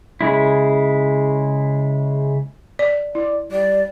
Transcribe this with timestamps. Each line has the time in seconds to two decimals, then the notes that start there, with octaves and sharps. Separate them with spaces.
0.21 C#3 G#3 E4
2.79 D5
3.15 E4 D5
3.52 G3 D5